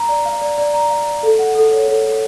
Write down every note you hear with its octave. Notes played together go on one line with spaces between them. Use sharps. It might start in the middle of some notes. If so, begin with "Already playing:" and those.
Already playing: A#5
D5
F5
D5
D5
A#5
F5
D5
A4
F#5
A4
C#5
A4
A4